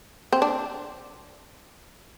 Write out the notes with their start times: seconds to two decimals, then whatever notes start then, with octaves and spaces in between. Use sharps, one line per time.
0.33 C4
0.42 D4